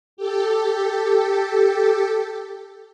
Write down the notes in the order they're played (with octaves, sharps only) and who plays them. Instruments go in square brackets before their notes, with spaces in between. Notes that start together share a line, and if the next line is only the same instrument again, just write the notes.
[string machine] G4 A4